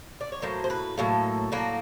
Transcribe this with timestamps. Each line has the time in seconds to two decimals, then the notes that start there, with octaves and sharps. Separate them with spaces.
0.21 D5
0.32 C#5
0.42 A2 F#3 A#3 C5
0.64 C5
0.70 B4
0.97 A2 F#3 A#3 A4
1.52 A2 F#3 A#3